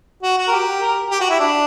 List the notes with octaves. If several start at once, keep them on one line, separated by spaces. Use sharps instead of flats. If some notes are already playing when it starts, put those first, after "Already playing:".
F#4
F#4
A#4
G4
A#4
G4
F#4
E4
D4